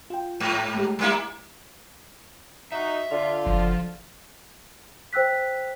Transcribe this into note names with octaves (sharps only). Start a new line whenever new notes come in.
F4 G5
G#2
G#3 A3 G4
G3 A#3 E4
D#4 F#4 E5
D3 F4
F#1 F3
C5 G5 E6 F#6 B6